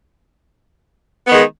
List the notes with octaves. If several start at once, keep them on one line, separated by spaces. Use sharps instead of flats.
D#3 G#3 B3